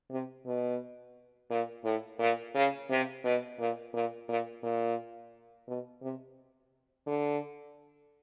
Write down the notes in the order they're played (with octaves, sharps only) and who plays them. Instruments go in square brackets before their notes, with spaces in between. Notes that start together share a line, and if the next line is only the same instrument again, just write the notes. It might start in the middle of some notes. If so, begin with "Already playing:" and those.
[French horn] C3
B2
A#2
A2
A#2
C#3
C3
B2
A#2
A#2
A#2
A#2
B2
C3
D3